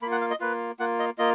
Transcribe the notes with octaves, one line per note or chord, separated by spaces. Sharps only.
A#3 F4 B5
F#5
F5
D#5
A#3 F4 B4
A#3 F4 F#5
D#5
A#3 F4 D#5